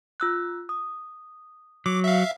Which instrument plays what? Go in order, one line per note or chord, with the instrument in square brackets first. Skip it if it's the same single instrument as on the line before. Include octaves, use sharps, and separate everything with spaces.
[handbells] F4 E6 F#6
D#6
[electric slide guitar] F#3 [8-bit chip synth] D6
[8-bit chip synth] E5 F5